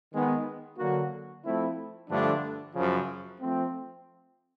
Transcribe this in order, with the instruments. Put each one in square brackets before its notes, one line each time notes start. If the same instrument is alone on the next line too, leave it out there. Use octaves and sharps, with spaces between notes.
[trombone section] D#3 G#3 B3
D3 F#3 A#3 D4 F#4
F3 A3 C4 E4
G2 D3 F3 A3 D4
F#2 C#3 F3
F3 A3 C4